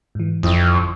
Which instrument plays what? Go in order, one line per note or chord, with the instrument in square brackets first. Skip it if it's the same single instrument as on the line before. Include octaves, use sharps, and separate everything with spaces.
[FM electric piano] G#2 E3
[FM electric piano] G1 E4 D#6 [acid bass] F2